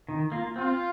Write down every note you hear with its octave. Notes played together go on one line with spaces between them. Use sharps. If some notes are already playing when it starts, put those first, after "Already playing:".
D#3
A#3 F4
C4 F4